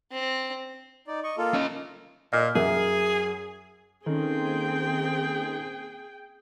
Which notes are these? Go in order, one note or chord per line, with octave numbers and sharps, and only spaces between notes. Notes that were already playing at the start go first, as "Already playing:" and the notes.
C4
D#4 D5
D#5 C#6
A#3 F4 A4
C#4 D#5
A#2 D#5
F#2 G#4 E5
D#3 A#3 C4 C#4 D#4 G#4 A4 G5